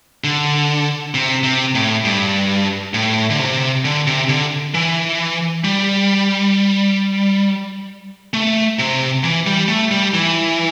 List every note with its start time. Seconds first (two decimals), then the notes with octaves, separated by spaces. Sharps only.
0.24 D3
1.15 C3
1.44 C3
1.75 A2
2.04 G2
2.94 A2
3.30 D3
3.39 C3
3.85 D3
4.07 C3
4.29 D3
4.74 E3
5.64 G3
8.34 A3
8.79 C3
9.24 E3
9.47 G3
9.68 A3
9.91 G3
10.14 E3